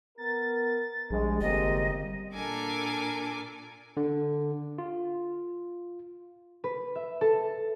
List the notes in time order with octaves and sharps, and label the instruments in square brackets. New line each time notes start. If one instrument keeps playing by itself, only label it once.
[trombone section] B3 A#4 [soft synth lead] A6
[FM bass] A#1 [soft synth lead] G3 [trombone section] G#3
[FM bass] G1 [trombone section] C3 G#3 A#3 [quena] D#5
[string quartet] A#2 D4 A4 A#4 G#5 D6
[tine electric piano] D3
F4
[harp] B4
E5
A4